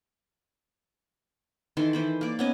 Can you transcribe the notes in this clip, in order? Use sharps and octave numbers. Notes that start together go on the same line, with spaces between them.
D#3 E3 A4 C6
E3 C5 B5
A#3 D5
B3 C#4 D#5